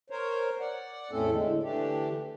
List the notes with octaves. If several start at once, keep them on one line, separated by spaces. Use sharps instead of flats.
A#4 C5 C#5
D5 F#5
E2 A2 A3 C4 C#4 A4
A2 D3 G#3
D3 E3 A3 D4 G4